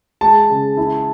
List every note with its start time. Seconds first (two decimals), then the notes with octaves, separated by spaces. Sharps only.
0.21 G#3 A5
0.50 C#3
0.77 E4